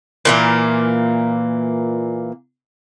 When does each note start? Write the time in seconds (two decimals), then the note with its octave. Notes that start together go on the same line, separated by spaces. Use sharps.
0.25 A#2 E3 A#3